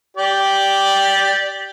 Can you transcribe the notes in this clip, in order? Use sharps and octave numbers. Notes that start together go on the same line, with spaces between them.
G4 D5